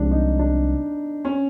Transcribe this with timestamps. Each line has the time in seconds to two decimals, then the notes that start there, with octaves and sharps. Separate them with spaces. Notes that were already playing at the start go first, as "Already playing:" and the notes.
Already playing: C2 C3 F3 G#3 D4
0.11 D#4
0.39 D4
1.25 C#4